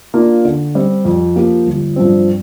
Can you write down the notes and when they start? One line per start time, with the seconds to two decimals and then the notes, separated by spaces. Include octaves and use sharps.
0.14 A#3 D4 F4
0.45 D3
0.75 G3 C4
1.05 F2
1.36 F3 A#3 G4
1.66 G1
1.96 G2 F3 C4